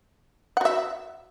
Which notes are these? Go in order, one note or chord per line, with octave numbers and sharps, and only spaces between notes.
F#4 E5 F#5